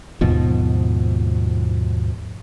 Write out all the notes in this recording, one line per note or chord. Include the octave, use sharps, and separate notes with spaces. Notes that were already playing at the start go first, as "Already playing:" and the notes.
D#2 G#2 B2 F3